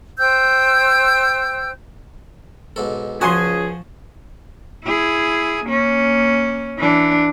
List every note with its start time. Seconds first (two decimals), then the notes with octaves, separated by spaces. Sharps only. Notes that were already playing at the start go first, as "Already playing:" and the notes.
0.19 C5 G5 E6 G6
2.76 B1 G#2 A4
3.21 C#2 F3 F#4 G#4 G#5 A5 C6 C#6
4.85 E4 G#4
5.65 A#3 C#4
6.78 E3 D4